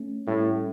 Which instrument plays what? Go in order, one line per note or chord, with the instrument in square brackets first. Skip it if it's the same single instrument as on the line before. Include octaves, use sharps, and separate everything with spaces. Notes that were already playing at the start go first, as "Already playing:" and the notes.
Already playing: [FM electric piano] A3 C#4
[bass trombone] A2 [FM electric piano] G3